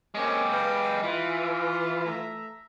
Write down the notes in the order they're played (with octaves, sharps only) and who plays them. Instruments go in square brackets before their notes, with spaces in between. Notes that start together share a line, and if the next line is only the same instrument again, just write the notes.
[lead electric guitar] G#3 G4 [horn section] A#3 C4 C#4
[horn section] B4 F5 G5
[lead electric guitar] E3 [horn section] F4
[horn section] A3 E5 A#5